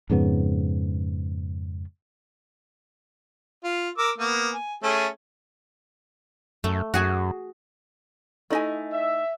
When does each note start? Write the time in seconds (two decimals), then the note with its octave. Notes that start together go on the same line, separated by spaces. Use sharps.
0.10 F2 G#2 C#3 B3
3.64 F4
3.98 A#4 D6 E6
4.18 A#3 B3
4.53 G#5
4.83 A3 C#4 G#4
6.64 F#2 A3
6.94 F#2 F#4 G#4 G#5
8.50 A3 D#4 E4 D#5 G#5
8.92 E5